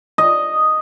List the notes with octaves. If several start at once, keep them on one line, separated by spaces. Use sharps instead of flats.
D#5